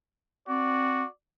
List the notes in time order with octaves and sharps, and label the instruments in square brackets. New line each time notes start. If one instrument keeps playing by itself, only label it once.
[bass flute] C4 [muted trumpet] F#4 [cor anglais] D5